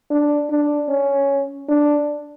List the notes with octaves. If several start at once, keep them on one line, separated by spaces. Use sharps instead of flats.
D4
D4
C#4
D4